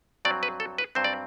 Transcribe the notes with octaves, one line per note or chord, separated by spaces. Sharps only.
G2 F#3 C4 D5
B4
A4
B4
G2 F#3 C4 C5
D5